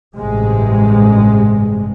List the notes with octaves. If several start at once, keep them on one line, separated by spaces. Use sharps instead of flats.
A1 G2 C3 G#3